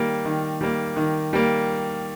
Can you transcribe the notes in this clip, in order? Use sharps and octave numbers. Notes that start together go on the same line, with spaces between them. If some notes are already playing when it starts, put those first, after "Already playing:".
Already playing: D#3 G3 A#3
D#3
G3 A#3
D#3
G3 A#3